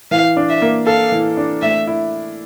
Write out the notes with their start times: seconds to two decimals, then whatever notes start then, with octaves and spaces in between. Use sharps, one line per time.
0.11 E3 F5
0.37 D4
0.49 E5
0.62 A#3
0.87 A4 F5
1.12 E3
1.37 D4
1.62 A3 E5
1.87 E4